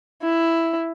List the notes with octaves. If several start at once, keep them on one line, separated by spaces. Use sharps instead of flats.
E4